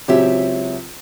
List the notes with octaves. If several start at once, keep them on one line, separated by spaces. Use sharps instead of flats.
C#2 F#3 C4 G4 C#5 E5